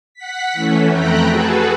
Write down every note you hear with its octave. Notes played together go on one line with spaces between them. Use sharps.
F#5 B6
E3 A3 C#4
F2 A3 G5 A#5 B5 F#6
F#4 G#4 A4 B4